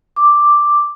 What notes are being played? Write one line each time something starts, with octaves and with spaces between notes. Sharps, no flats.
D6